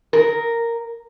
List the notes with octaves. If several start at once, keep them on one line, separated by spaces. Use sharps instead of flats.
A#4